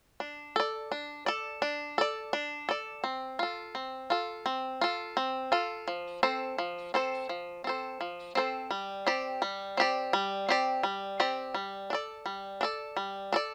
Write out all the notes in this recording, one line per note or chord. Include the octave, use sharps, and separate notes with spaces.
D4
A4 D5
D4
A4 D5
D4
A4 D5
D4
A4 D5
C4
F4 A4
C4
F4 A4
C4
F4 A4
C4
F4 A4
F3
C4 A4 C5
F3
C4 A4 C5
F3
C4 A4 C5
F3
C4 A4 C5
G3
C4 G4 D5
G3
C4 G4 D5
G3
C4 G4 D5
G3
C4 G4 D5
G3
D4
A4 D5
G3
D4 A4 D5
G3
D4 A4 D5